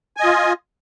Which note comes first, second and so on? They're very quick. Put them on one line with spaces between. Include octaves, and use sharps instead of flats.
G#5 D#5 F4